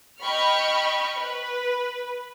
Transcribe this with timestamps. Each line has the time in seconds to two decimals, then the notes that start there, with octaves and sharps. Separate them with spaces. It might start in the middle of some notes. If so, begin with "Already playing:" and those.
0.21 D#5 G5 B5 C#6 F6
1.18 B4